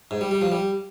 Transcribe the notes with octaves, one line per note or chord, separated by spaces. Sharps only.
G#2
G3
G3
F3
G3